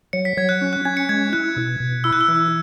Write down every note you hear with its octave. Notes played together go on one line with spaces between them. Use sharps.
F#3 C#7
B6
F#3 G#6
F#6
C#4
F#6
C#4 G#6
C#7
G#3 G#6
E4 F#6
B2
B2
E4 E6
F#6
E6
E3